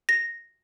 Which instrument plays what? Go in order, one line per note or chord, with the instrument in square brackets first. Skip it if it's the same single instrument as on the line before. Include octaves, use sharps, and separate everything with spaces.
[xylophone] A#6